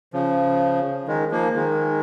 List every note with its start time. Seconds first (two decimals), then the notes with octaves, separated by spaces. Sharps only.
0.13 C#3 F3
1.08 D#3 G#3
1.31 F3 A#3
1.56 D#3 G#3